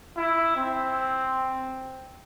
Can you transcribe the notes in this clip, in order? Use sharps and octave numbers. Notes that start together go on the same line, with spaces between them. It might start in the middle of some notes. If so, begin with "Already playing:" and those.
E4
C4